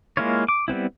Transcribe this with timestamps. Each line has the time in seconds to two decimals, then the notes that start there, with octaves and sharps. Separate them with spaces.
0.17 G#3 A#3 E4 F4 C#5
0.49 D6
0.68 G3 B3 C4 E4